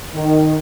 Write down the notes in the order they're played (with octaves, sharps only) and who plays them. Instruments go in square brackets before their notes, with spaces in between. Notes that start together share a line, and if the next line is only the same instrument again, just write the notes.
[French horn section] D#3